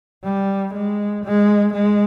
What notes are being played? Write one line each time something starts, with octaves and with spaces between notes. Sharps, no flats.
G3
G#3
G#3
G#3